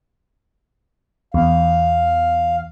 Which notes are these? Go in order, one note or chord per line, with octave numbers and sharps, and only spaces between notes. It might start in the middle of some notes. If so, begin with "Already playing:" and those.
E2 F5